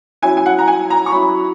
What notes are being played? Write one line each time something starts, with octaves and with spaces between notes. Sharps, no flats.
F#3 C#4 E4 G#5
G#5
F#5
A#5
G#5
A#5
C#6
F#3 C#4 E4 B5